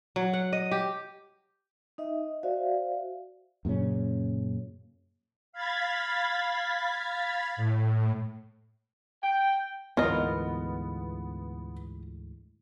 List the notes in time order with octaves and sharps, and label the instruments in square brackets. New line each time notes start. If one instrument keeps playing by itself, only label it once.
[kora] F#3
F#5
D#5
G4
[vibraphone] D#4 D#5 E5
F#4 C5 D5 E5 F5
[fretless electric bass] F#2 A#2 C#3 C#4
[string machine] F5 B5 G#6 A6 B6
A2
[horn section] G5
[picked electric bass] D2 G#2 E3 [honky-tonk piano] B3 [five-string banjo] F4 A#4 D#5